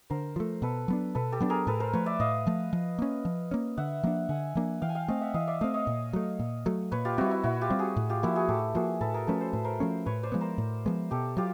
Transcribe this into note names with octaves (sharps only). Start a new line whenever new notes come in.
D3 A#4 C5
F3 A3
B2 A4 B4
F#3 B3 D4
B2 A4 B4
G4 A4
F#3 B3 D4
G#4 A#4
A2 A4 B4
A#4 C5
F3 A3 B4 C#5
D5 E5
A2 D#5 F5
F3 A3
F3
A#3 C#4
F3
A#3 C#4
D3 E5 F#5
F3 A#3 D4
D3 F#5 G#5
F3 A#3 D4
E3 F5 G5
G#5
F5 G5
A3 C4 D#5 F5
E5 F#5
E3 D#5 F5
D5 E5
A3 C4 D#5 F5
C#5 D#5
A#2
F#3 A3
A#2
F#3 A3
A#2 B4 C#5
F4 G4
G3 C4 E4 F#4
E4
A#2 E4 F#4
F4 G4
G3 C4
F#4 G#4
A2
F4 G4
F3 A#3 E4 F#4
F#4 G#4
A2 G4 A4
F3 A#3 F#4 G#4
A2 A4 B4
G#4 A#4
F3 A3 C#4 A4 B4
C5
A2 B4
A#4 C5
F3 A3 C#4
A2 B4 C#5
C5 D5
F3 G#3 B3
A#4 C5
A2
F3 G#3 B3
B2 G4 A4
F#3 F4 G4